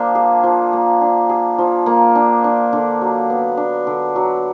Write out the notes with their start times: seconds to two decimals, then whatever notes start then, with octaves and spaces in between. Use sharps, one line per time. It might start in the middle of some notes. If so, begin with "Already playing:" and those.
Already playing: F3 A#3 D4
0.15 G#4
0.43 F3
0.73 A#3
1.01 D4
1.29 G#4
1.58 F3
1.86 A#3
2.15 D4
2.44 D4
2.73 D3
3.01 F#3
3.30 B3
3.57 D4
3.87 D3
4.16 F#3